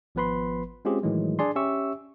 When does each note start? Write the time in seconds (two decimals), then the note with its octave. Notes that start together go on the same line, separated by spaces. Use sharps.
0.15 G#1 F3 B3 B4 B5 C6
0.85 G#3 C4 C#4 F4 G4 G#4
1.03 A2 D#3 E3 F#3 G#3
1.39 D4 G#4 D5 G#5 C6
1.56 C#4 G4 E5 C#6 E6